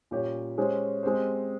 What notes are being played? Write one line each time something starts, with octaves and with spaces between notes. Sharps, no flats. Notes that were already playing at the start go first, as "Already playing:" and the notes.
A#2 G3 C#4 G4 C#5
G#3 C#4 G4 C5
G#3 C4 G4 C5